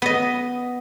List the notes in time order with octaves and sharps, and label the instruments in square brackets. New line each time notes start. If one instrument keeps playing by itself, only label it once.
[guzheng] B3 D#5